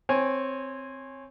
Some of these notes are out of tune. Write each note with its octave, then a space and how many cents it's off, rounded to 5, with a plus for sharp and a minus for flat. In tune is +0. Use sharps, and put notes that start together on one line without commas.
C4 +0 C#5 -15 G#5 +0